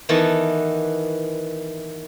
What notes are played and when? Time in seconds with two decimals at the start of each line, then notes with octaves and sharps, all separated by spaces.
0.09 D#3 E3 B3 F#4 A4